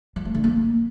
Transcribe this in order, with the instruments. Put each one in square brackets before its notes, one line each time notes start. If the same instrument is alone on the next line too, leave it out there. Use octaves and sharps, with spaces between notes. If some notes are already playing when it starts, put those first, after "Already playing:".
[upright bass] F3
A3
D3
A#3